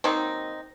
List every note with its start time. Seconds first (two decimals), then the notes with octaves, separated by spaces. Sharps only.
0.04 D#3 F#3 A#3 C4 D#4